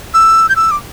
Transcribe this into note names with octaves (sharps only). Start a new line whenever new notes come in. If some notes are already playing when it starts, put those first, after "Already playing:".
E6
G6
E6
D6